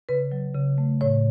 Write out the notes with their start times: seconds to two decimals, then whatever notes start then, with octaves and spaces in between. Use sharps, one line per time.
0.09 C#3 B4
0.32 F#3
0.54 C#3
0.78 A3
1.01 A2 C#5